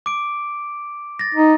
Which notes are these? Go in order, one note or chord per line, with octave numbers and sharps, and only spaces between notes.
D6 D7
A6 A#6
D#4